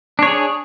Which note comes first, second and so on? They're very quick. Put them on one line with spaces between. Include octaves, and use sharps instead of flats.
D4 C#5 G#4